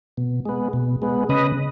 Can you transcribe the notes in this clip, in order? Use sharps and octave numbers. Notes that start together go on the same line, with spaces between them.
B2
G#3 B3
B2
G#3 B3
C#3 B4 D#5